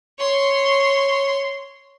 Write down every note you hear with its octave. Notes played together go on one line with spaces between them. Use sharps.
C#5 C6